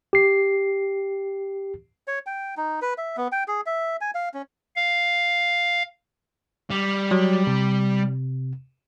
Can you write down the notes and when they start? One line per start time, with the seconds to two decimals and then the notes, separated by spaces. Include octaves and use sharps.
0.13 G4 C7
2.08 C#5
2.26 G5
2.57 D#4
2.82 B4
2.98 E5
3.17 B3
3.32 G5
3.48 G#4
3.66 E5
4.01 G#5
4.15 F5
4.34 C#4
4.76 F5
6.70 G3
7.11 F#3
7.47 C3